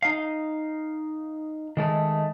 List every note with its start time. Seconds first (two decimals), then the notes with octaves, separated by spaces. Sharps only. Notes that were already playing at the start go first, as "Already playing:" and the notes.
0.02 D#4 F5
1.77 D#3 G#3 A3